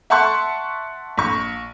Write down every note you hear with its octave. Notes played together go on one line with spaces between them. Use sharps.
E5 F#5 A5 C6 C#6 F#6
A#1 C#6